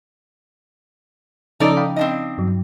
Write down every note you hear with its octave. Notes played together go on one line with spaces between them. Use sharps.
C#3 F3 C#4 D#4 A4 D5
F5 G5 B5
C4 D4 D#4 D#5
G2 F#3